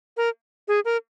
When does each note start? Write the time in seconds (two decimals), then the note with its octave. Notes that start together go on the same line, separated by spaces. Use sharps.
0.17 A#4
0.68 G#4
0.85 A#4